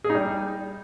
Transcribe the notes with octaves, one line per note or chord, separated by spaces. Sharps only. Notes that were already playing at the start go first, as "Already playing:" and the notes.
G#4
D#4
G3